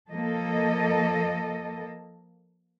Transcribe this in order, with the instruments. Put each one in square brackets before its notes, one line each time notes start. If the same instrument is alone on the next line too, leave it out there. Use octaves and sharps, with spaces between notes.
[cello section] F3 A#3 A4 D#5